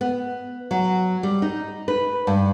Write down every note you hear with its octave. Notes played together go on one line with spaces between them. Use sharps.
B3
F#3
G3
D#4
B4
G2